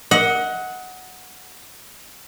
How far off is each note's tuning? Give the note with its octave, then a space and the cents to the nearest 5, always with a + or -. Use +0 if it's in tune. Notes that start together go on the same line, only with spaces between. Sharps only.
D#5 +35 F#5 +0